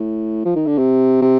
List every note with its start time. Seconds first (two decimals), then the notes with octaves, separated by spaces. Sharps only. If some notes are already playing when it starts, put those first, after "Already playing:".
Already playing: A2
0.45 F3
0.56 D#3
0.67 D3
0.78 C3
1.22 C3